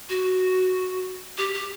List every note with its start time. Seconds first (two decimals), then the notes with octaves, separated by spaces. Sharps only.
0.09 F#4
1.37 G4
1.53 G4